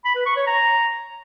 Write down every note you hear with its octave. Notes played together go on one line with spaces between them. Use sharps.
B5
B4
C#6
C#5
A#5